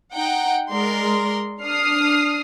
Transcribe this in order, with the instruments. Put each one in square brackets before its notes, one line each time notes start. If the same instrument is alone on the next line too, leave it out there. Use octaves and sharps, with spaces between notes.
[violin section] D#4 F#5 G5
[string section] G#3 [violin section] A#4 D5 C6
[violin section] D4 [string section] D#6 F6 C7